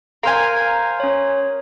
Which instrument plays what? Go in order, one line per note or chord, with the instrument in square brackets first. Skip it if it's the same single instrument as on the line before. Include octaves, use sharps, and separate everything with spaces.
[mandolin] A#4 C5 G#5 [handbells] F5 A#5 F6
[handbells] C#4 C#5